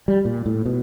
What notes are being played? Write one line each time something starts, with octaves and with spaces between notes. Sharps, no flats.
G3
A#2
A2
B2